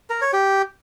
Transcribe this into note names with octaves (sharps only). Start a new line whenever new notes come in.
A#4
C#5
G4